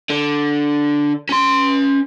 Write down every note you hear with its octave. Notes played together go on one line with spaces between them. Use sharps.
D3
C#4 C6